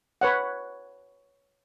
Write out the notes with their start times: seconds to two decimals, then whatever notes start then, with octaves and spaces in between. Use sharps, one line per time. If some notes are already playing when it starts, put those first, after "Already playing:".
0.21 B4 C#5 F#5